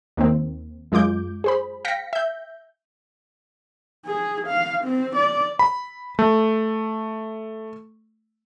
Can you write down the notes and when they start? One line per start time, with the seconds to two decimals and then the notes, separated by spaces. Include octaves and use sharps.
0.17 D#2 D#3 A#3 C4
0.92 F#2 G#3 F4 D6 G6
1.44 G#4 C5 B5
1.85 F5 G5 A#6 B6 C#7
2.13 E5 G6
4.06 G#4
4.47 F5
4.84 C4
5.16 D5
5.59 B5
6.19 A3